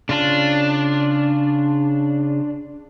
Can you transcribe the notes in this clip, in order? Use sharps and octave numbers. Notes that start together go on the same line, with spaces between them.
C#3 D4 F4 A5